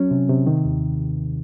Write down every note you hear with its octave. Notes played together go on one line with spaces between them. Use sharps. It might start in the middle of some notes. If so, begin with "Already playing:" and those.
Already playing: F#3 C#4
C3
C3
D#3
D#2